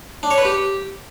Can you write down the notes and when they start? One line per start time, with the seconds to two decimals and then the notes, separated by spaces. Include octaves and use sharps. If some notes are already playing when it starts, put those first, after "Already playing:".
0.23 D4
0.30 C#5
0.38 B4
0.45 G4